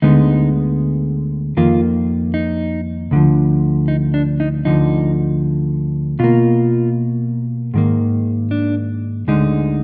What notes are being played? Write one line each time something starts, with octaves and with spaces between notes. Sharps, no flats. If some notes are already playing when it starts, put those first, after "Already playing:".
D2 D3 G#3 B3 D#4
F2 D#3 A#3 F4
D#4
D2 D3 F3
D#4
D4
D#4
D2 D3 F3 D#4
B2 A#3 F4
G#2 D#3 A#3
D4
D2 D3 G#3 D#4